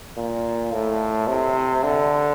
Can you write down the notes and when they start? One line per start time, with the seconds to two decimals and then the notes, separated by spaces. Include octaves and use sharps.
0.17 A#2
0.72 A2
1.27 C3
1.83 D3